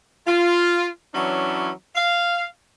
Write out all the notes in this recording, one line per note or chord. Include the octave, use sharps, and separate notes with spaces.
F4
E3 F#3 C#4 D4 E4
F5